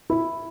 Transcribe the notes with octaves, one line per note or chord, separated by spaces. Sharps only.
E4